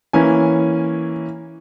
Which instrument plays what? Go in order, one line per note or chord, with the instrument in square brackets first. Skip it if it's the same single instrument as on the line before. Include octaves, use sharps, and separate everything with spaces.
[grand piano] E3 A#3 C#4 G#5